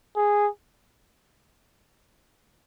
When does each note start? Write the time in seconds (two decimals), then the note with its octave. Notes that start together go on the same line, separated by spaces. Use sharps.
0.17 G#4